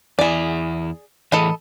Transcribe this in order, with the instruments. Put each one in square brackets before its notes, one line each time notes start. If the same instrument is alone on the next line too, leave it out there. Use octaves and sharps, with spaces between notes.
[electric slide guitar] E2 E4 [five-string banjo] G#4 D5
[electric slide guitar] A2 E3 G#4 [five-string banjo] A4 D#5 B5